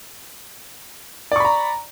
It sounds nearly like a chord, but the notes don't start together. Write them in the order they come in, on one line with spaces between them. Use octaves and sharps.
D5 C#6 B5 A#5